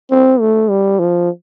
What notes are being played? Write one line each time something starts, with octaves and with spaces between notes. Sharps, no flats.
C4
A3
G3
F3